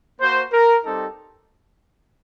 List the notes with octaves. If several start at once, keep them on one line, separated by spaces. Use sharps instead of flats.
A#3 F#4 C5
A#4
G3 C4 D#4 G4 A4